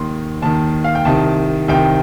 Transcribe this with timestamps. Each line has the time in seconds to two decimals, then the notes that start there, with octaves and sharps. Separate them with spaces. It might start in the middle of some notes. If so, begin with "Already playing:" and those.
Already playing: D#2 D#3 C6
0.42 D#2 D#3 A5
0.84 F5
0.95 G5
1.05 C2 C3 D#3 A5
1.68 C2 C3 D#3 G5